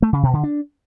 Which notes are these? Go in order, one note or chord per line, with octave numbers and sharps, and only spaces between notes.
A3
C#3
B2
D3
D4